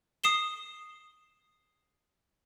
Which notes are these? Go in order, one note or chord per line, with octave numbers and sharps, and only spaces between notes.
D#6 C7 E7 G7